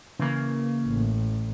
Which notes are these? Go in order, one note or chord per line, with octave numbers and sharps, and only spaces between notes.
C#3 E3 A#3
A1